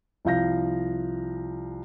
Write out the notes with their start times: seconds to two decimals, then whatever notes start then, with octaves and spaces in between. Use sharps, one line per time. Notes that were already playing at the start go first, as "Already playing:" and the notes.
0.25 C2 F3 F5 G6 A#6